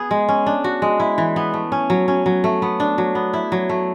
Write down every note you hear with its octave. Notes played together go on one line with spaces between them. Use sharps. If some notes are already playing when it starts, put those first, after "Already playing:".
Already playing: B3 G#4
G#3
C#4
D4
F#4
G#3
E4
E3
B3
A3
C#4
F#3
C#4
F#3
A3
B3
D4
F#3
B3
E4
F#3
A3